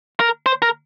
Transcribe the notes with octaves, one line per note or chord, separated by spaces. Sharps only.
A#4
C5
A#4